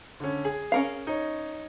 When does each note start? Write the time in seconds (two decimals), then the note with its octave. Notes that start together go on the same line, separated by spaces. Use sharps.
0.20 D3 C#4
0.45 G#4
0.72 C#4 A#4 F5
1.07 D#4 C#5